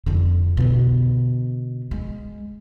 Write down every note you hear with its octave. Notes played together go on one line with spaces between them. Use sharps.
F2 D3
B2 D3
G#3